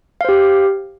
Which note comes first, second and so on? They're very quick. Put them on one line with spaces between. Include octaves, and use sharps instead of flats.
F5 C5 G4